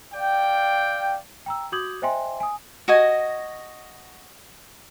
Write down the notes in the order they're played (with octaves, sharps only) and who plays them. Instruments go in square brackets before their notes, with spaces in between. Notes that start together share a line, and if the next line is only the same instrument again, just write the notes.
[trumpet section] D5 F5 G5
[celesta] G5 A#5 E6
F#4 D6 D#6 G6 G#6 F#7
C5 D#5 E5 G5 G#5 C6
G#5 D#6
[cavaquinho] F#4 D#5 G#5